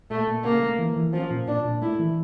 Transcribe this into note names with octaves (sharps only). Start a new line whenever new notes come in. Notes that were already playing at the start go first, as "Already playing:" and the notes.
A#2 A3
A#2
C#3 A#3
A3
E3
E3
F3 C#4
A#2
A#2 D4
A#2
A3 E4
E3